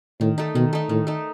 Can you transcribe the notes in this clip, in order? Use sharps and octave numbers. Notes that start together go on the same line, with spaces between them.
A2 D#3
A3 D#4
B2 D#3
A3 D#4
A2 D#3
A3 D#4